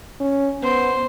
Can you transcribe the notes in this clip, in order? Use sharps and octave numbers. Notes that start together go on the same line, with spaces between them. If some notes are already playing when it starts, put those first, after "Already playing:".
C#4
B3 C5